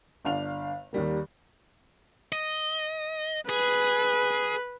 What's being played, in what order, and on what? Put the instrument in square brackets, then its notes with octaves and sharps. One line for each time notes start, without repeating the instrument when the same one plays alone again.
[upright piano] G1 D4 F5 F7
D#2 D#3 G3 A#3
[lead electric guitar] D#5
[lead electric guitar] G#4 [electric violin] B4